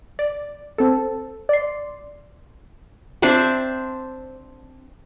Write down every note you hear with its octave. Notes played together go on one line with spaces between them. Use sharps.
D5
C4 A4
D5 C6
C4 D4 C5 E5